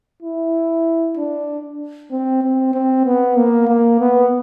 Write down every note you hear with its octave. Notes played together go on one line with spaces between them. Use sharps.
E4
D4
C4
C4
C4
B3
A#3
A#3
B3